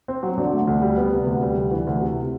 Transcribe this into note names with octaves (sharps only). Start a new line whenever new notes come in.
C4
F#3
D3
A3
D2
G3
B3
C3
D2
G3
D2
E3
D2
C3